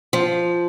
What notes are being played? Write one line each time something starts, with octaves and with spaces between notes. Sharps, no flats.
F3